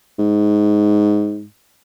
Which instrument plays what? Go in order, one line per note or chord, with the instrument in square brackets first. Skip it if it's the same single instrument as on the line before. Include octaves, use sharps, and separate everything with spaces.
[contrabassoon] G#2